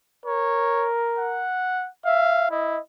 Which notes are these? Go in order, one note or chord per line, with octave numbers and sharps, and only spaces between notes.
A#4 C#5
F#5
E5 F5
E4 D#5